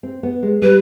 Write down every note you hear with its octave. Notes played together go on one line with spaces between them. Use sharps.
C4
B3
G#3
G3 B4